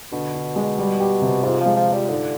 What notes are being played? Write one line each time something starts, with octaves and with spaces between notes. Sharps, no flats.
B2 D3
D3
G#3
G3
G4
C3
G#2 F4
F3 G#3
F3
F4
G3
G#2 D3